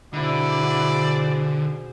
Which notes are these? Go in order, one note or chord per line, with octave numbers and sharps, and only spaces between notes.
B2 D3 E4 G#4 C5 D5